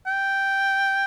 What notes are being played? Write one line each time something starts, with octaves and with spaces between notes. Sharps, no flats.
G5